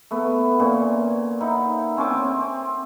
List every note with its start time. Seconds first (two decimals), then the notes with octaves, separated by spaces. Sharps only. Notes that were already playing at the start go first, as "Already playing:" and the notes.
0.11 A3 B3
0.60 A#2 C#4
1.41 D#4 E4 F#5
1.97 C4 C#4 G#5 D6
2.25 C4